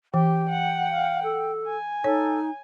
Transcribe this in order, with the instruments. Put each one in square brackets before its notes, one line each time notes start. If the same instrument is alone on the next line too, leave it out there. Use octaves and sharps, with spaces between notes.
[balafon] E3 [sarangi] G4 [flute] G5
[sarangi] F#5
[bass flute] F5
A4
[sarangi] G#5
[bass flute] D#4 [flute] A4 [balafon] C#5